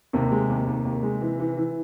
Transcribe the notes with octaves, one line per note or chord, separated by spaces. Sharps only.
D#2 C3
G#3
D#2
D#2
D#2
G#3
E3
E3
E3